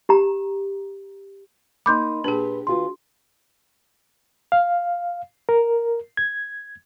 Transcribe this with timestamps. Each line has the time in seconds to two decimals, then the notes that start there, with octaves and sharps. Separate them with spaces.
0.09 G4 A#5
1.86 A#3 D#4 B5 C6 D6 G6
2.24 A#2 D4 G4 G#4 B4
2.67 D2 F4 F#4 B4 C6
4.52 F5
5.49 A#4
6.17 G#6